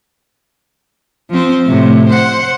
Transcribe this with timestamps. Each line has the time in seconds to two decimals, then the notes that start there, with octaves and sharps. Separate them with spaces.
1.31 F3 C4
1.66 A2 C3
2.09 C5 F#5